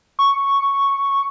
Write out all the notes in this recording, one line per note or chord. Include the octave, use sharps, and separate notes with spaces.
C#6